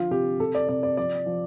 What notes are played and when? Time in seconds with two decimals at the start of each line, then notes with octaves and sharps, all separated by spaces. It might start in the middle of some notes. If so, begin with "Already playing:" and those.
Already playing: D3 F3 F4
0.11 C3 G4
0.40 C3 A4
0.55 D5
0.69 C3 D5
0.83 D5
0.97 F3 D5
1.26 F3